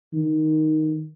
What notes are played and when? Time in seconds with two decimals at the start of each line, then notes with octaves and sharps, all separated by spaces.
0.14 D#3